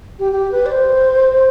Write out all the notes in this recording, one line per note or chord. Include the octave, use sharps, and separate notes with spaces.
G4
G4
B4
D5
C5